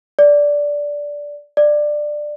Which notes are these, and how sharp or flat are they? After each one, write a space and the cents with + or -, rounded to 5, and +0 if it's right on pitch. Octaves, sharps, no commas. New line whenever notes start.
D5 -10
D5 +15